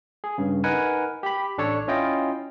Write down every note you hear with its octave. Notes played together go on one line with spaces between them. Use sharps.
G#4
G2 C#3
D#4 A#4 B4 F#5 G#5
G4 B5
A1 D4 A4 C#5
C#4 E4 F4 D#5 G5